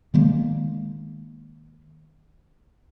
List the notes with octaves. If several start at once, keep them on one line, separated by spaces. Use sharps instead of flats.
D#3 G#3 A#3